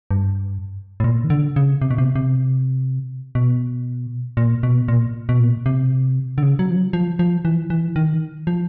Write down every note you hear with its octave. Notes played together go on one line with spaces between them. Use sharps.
G2
A2
A#2
D#3
D3
C#3
C3
B2
C3
C3
B2
A#2
B2
A#2
B2
A#2
C3
D3
C#3
F#3
F3
F#3
F3
F3
E3
E3
D#3
F3